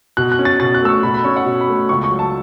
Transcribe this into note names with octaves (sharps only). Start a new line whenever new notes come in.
B2 F#6
F#6
C#4
A6
B2 A6
F#6
A3 E6
C#6
B2 B5
B5
C#4 C#5
F#5
B2
B5
A3
C#2 C#6
C#6
F#3
A5